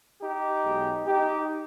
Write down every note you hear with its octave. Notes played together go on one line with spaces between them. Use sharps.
D#4 G4
B1 B2 G#3
D#4 G4